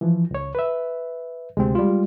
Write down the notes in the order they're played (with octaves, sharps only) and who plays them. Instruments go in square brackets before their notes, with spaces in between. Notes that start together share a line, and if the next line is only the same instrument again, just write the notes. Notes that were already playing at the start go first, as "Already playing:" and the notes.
[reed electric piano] E3 F3
C#2 C#5
B4 E5
[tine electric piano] D2 C3 C4 [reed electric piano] G#3
[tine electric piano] G3 F4